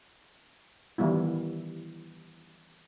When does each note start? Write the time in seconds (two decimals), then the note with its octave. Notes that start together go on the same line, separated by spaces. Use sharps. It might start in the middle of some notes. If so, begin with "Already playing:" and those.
0.98 D#3 E3 G3 B3 E4